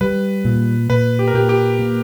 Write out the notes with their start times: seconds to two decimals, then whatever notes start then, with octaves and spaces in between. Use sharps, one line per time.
0.01 G3 B4
0.45 A#2
0.90 A#2 B4
1.19 G4
1.28 A#4
1.34 A#2 G4
1.49 G4
1.79 A#3